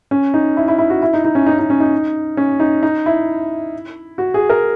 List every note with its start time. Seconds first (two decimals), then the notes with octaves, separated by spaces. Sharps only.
0.11 C#4
0.34 D#4
0.57 E4
0.68 E4
0.78 E4
0.90 F#4
1.02 E4
1.13 D#4
1.24 D#4
1.35 C#4
1.46 D#4
1.53 C#4
1.59 D#4
1.70 C#4
1.80 D#4
2.37 C#4
2.60 D#4
2.83 D#4
3.06 E4
4.18 F#4
4.34 G#4
4.50 A#4